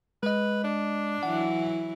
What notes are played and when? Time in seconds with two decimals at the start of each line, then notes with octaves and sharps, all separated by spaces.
0.23 G#3 B4 D#5
0.64 D4
1.23 E3 F#3 E4 F#5